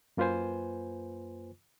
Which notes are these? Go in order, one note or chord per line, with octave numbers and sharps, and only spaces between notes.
F#2 A#3 F4 B4 C5 G#5